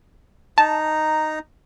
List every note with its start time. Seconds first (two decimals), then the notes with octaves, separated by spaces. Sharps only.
0.58 D#4 A5 A#5